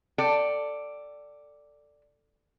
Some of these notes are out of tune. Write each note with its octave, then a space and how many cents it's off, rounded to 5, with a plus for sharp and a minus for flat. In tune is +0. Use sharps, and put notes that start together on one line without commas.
A4 +15 D5 +0 G5 -10